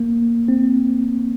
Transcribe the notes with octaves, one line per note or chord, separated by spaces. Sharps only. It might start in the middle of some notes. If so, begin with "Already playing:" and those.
Already playing: A#3
C4